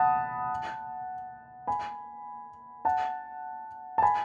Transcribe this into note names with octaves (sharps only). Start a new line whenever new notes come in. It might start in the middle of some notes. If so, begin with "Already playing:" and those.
Already playing: F#5 A5 B5 D#6
G#5 B5
F#5 A5
A5
G#5 B5